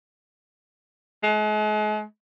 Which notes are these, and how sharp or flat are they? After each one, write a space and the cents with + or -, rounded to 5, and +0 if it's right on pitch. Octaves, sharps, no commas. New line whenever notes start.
G#3 +40